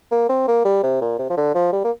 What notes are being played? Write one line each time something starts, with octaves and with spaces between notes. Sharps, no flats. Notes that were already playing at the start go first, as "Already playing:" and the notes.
A#3
C4
A#3
G3
C3
A#2
C3
F3
D3
F3
G3
A#3